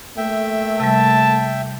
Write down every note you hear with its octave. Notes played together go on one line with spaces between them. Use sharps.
A3 A#3 E5 G5
C3 G3 A5